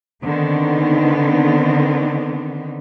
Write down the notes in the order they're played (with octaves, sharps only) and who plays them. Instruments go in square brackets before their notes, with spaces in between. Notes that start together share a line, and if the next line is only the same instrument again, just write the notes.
[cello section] D3 D#3 B3 C4